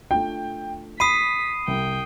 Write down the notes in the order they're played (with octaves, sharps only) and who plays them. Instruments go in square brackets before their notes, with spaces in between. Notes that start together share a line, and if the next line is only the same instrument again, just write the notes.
[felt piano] A3 D4 F4 [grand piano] G5
[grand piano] B5 [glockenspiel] D#6 C7 D#7 [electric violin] B6
[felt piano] C2 [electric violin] G5